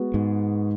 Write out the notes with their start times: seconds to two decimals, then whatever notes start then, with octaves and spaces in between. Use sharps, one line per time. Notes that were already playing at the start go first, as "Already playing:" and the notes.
Already playing: G#3 B3 F#4
0.14 G#2